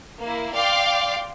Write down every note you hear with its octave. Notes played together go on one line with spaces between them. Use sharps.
A#3 E4
D5 F5 G5 C6 D6